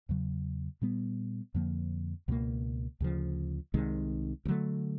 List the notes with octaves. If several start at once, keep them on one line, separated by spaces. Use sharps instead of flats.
E2 C#3 F#3
A#2 G3 B3
F2 D3 F3 A#3
C#2 B2 F#3 A#3
D2 C#3 F3
C2 C3 D#3 G#3
D2
D3 F#3 A3